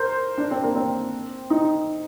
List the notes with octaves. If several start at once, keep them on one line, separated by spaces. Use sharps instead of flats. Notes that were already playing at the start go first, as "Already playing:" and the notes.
Already playing: A#4 C5
D4
C4
A#3
C4
D#4